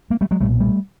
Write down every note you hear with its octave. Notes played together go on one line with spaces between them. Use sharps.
G#3 A#3
G3 A3
F#3 G#3
B1 A#2 G3 A3
G3 A3